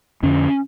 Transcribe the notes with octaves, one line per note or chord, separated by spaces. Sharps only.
F2 D3 C#4